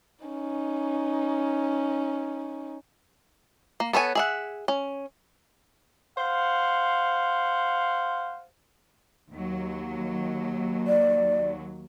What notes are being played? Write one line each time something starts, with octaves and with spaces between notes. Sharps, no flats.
C#4 D#4
A#3
B3 A4 C#5 G#5
G#4 E5 F#5
C#4
C5 F5 F#5
D#2 F#3
D5